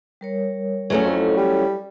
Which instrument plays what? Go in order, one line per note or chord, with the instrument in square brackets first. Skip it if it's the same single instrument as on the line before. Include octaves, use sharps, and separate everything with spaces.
[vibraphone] G3 A#4 C#5
[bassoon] E2 [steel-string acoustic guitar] F#3 A3 C#4 [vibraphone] A4
[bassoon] F2 [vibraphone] E4 A4
[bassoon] G3